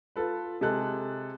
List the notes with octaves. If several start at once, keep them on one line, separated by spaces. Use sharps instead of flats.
F4 A4 B4
C3 G#3 A4 F#6